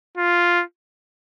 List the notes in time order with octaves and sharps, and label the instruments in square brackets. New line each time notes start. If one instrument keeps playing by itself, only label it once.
[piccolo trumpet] F4